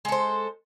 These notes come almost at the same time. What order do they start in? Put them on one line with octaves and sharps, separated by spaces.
G#3 A4 C5